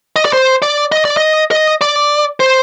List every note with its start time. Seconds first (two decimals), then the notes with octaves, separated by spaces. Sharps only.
0.16 D#5
0.25 D5
0.33 C5
0.62 D5
0.92 D#5
1.05 D5
1.17 D#5
1.51 D#5
1.81 D5
2.40 C5